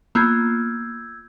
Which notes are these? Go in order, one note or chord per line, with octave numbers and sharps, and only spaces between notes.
A#3 B3 F4 E6 G6 G#6